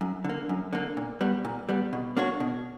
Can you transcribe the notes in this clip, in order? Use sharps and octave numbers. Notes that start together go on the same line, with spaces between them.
F#2
D3 A#3
F#2
D3 A#3
A#2
G3 B3
A#2
G3 B3
B2
A#3 D4 F#4 C#5
B2